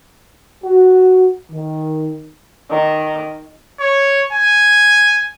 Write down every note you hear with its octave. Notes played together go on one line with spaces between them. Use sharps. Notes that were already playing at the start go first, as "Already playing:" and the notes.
F#4
D#3
D#3
C#5
G#5